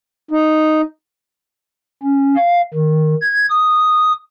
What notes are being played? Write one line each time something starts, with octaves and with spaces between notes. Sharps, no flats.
D#4
C#4
F5
D#3
G#6
D#6